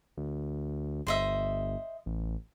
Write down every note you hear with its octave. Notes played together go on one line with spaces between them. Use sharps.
D2
G1 C5 D#5 E5
A1